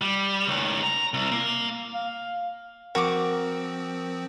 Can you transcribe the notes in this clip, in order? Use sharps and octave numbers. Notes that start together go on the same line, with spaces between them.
G3
C#2 D#3
A#5
C2
A#3
F5
F3 C4 F#4 A#4 D6